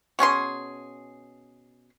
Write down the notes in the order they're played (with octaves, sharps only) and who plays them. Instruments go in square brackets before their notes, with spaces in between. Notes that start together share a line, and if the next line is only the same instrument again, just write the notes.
[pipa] B2 C#4 G#4 C6